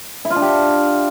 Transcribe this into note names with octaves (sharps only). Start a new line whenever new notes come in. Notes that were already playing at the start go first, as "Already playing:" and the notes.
E4
F4
D4
G4